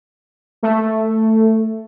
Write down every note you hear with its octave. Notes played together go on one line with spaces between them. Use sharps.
A3